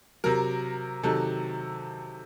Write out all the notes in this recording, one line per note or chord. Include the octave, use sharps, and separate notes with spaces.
C3 F#3 A#4
C3 D#3 F#3 A4